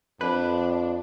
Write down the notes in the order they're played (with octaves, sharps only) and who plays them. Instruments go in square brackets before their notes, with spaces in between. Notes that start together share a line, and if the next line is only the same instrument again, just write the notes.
[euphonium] F2 [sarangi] D4 [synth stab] B4